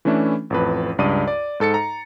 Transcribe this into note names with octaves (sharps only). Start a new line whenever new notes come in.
E3 A3 C#4 D4 E4
A1 F2 B4
C#2 G2 D5 D6 D#6 D#7
D5
G#2 A4 A6 C#7
A#5